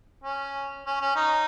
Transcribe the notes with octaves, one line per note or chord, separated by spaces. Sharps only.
C#4
C#4
C#4
D#4